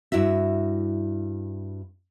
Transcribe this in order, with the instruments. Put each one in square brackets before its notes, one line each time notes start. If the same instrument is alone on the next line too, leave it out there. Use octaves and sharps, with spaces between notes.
[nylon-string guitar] G2 E4 F#4 E5